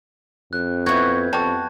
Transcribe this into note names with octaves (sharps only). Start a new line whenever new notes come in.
F2 F#6
B3 E4 F#4 G6 G#6
F2 G3 F#4 A5